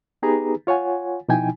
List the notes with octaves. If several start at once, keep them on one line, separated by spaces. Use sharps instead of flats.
B3 D#4 G4 G#4 B4 A#5
F4 C#5 F#5 G#5
B2 F3 D#4 E4 G5 G#5